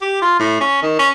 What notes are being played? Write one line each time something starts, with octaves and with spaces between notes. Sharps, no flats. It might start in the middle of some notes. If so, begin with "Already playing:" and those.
G4
F4
A2
C#4
D#3
C#4